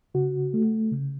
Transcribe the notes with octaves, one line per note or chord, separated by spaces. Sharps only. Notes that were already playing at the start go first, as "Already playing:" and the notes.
C#3 F#4
A3
C#3